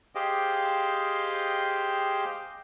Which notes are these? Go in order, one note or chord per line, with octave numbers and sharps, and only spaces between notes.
G4 G#4 C5 D#5 F5 G5